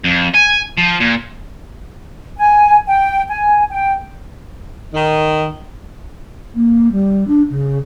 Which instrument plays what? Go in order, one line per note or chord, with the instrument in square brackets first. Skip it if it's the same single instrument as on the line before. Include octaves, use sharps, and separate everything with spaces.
[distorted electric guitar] F2
G#5
F3
A#2
[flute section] G#5
G5
G#5
G5
[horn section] D#3
[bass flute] A#3
G3
D4
C#3